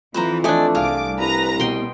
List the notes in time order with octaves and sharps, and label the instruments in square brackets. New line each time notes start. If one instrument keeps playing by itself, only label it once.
[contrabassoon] F2 [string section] E3 [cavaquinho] B4 C5 A#5
[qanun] A3 D4 [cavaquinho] D5 D#5 G#5
[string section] C2 D6 [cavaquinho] G#4 F5 A5
[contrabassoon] C2 [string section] B4 A#5 A#6
[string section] B2 [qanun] D#5 G5 C6